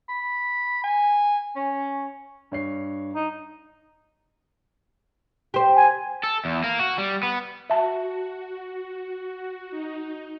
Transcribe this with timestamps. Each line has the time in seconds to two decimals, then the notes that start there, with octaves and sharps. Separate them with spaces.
0.09 B5
0.84 G#5
1.56 C#4
2.52 G2 C#5 C7
3.15 D#4
5.54 G4 C5
5.76 G#5
6.23 A4
6.45 E2
6.64 A#3
6.79 F#4
6.98 G3
7.23 B3
7.70 F#4 E5 A5
9.71 D#4